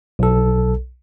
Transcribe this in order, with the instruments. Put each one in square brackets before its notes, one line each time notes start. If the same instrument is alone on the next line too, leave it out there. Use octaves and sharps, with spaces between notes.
[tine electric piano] B1 A4